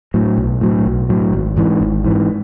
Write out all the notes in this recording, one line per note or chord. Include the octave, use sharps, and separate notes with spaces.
A2 F#3
B1
A2 F#3
B1
A2 F#3
G#1
G#2 E3
G#1
G#2 E3